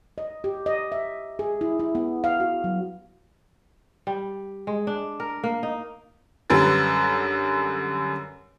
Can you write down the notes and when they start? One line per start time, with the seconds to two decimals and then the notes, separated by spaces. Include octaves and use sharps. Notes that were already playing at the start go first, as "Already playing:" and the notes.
0.18 D#5
0.44 G4
0.66 D#5
0.92 E5
1.39 G#4
1.61 E4
1.79 E4
1.95 B3
2.24 F5
2.40 F#4
2.64 F#3
4.07 G3
4.67 G#3
4.87 D4
5.20 A#4
5.44 A#3
5.63 D#4
6.50 F#2 D3 G3 B4 A6